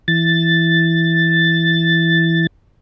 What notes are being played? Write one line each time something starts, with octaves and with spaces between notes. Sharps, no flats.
E3 A6